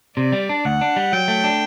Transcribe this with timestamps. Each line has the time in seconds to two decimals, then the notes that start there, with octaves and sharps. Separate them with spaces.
0.16 C3 D5
0.32 G3
0.49 D4
0.65 D2 F#5
0.81 D4
0.96 G3
1.12 F#3 G5
1.28 A3
1.44 D4